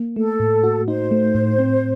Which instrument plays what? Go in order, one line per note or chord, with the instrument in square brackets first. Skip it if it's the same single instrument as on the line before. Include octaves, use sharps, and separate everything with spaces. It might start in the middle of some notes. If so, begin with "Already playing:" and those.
Already playing: [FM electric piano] A#3
[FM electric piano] A3 [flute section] A4
[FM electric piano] A2
F#4
[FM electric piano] D#4 [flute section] C5
[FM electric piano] A3
A2
C4